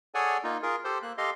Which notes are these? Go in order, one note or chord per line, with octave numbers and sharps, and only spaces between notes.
G#4 A4 C#5 D5 F#5 G#5
A#3 D#4 F4
F4 G#4 A#4
G4 A4 C5
A#3 F#6
G4 A4 D#5 F5 C6